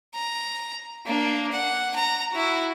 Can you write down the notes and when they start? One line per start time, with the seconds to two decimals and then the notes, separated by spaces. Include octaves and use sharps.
0.14 A#5
1.06 A#3 D4
1.52 F#5
1.95 A#5
2.31 E4 F#4